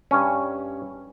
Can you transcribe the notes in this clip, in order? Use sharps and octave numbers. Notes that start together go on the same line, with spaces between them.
G2 C#4